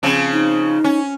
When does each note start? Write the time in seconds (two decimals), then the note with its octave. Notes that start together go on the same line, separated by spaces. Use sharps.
0.03 C#3 F3 C4
0.33 D#4
0.84 C#4